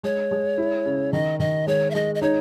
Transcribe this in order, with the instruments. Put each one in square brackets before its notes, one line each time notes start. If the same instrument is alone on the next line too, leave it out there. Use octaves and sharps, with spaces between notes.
[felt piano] G#3 [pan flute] C#5
[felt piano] G#3
E4
C#3
[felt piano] D#3 [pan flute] D#5
[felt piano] D#3 [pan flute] D#5
[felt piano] G#3 [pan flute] C#5
[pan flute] E5
[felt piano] G#3 [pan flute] D#5
[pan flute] D#5
[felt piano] D#4 [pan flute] C#5